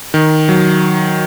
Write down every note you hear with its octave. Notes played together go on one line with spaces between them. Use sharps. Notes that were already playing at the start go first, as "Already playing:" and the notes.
D#3
F#3